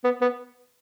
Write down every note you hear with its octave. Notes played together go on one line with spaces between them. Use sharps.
B3
B3